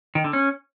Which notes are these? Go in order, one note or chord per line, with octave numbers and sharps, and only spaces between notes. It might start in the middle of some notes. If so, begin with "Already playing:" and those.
D#3
D3
C#4